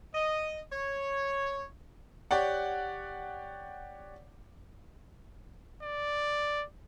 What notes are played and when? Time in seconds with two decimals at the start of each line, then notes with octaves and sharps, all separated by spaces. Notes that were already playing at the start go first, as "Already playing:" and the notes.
0.15 D#5
0.72 C#5
2.31 G4 C#5 D5 F#5
5.83 D5